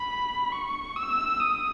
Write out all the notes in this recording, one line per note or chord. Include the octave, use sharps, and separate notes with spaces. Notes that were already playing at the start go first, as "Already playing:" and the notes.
Already playing: B5
C#6
E6
D#6